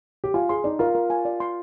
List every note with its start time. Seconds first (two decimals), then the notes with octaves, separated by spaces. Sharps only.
0.24 G4
0.34 F4 G#5
0.49 G#4 C6
0.64 D#4 D5
0.79 F4 A#4
0.95 A#4
1.10 G#5
1.25 D5
1.40 C6